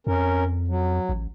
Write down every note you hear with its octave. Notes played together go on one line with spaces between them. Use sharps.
F2 C#4 A#4
F#3
A1